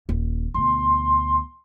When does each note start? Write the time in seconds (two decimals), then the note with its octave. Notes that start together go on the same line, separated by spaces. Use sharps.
0.09 D#1
0.54 D2 B2 C6